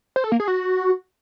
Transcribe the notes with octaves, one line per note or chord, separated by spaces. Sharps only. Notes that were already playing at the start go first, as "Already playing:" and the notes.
C5
A4
A#3
G#4
F#4